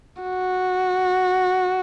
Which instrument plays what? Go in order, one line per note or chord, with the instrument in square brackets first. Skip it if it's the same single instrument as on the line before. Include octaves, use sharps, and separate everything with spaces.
[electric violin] F#4